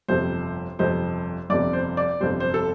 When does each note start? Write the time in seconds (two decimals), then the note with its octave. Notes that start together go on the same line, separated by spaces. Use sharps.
0.08 G1 F2 C3 C5
0.79 G1 F2 C3 C5
1.50 G1 F2 C3 D5
1.73 C5
1.97 D5
2.20 G1 F2 C3 C5
2.40 C5
2.54 A4